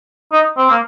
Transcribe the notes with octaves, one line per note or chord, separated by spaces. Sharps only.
D#4
C4
A#3